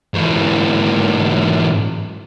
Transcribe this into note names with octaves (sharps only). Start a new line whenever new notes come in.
G#2 E3